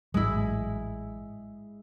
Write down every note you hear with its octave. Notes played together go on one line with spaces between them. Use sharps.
A1 G#2 F#3 G#3 E4